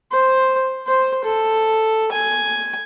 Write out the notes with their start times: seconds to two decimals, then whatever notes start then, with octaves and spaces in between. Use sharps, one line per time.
0.12 C5
0.88 C5
1.25 A4
2.12 G#5